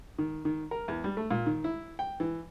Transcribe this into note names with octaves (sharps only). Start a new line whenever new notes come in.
D#3
D#3
A#4
E2
G3
A3
A#2
D#3
E4
G5
E3